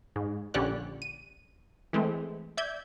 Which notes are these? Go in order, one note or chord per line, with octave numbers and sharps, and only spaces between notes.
G#2
A#1 D3 C#4 G4 D5 F#6
D#7
E3 G#3 A3 C4
D5 E5 G6 G#6